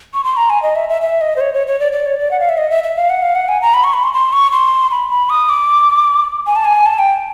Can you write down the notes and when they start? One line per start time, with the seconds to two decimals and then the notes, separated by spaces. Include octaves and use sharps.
0.14 C#6
0.24 C6
0.37 A#5
0.50 G#5
0.63 D#5
0.76 E5
0.89 E5
1.02 E5
1.21 D#5
1.36 C5
1.41 C#5
1.54 C#5
1.67 C#5
1.80 D5
1.92 D5
2.06 C#5
2.19 D5
2.31 F#5
2.40 F5
2.49 E5
2.58 D#5
2.70 E5
2.84 E5
2.96 F5
3.10 F#5
3.22 F5
3.35 F#5
3.49 G#5
3.62 A#5
3.74 B5
3.84 C#6
3.94 B5
4.03 C6
4.14 C6
4.33 C#6
4.52 C6
4.91 B5
5.10 B5
5.30 D#6
5.49 D6
6.47 G#5
6.56 A5
6.65 G#5
6.86 A5
6.99 G5